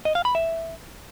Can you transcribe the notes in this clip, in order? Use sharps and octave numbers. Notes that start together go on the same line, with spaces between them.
D#5
F5
B5
E5